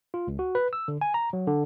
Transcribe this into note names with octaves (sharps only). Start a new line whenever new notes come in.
F4
C#2
F#4
B4
E6
D3
G#5
A#5
F#3
D3